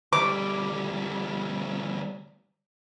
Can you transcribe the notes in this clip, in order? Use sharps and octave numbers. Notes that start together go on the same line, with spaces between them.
D2 G3 D6